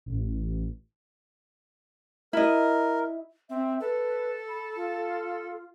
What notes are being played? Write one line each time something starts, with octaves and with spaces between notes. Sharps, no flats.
A1
E4 A#4 D#5
C4 E5
A4 B4
B5
F4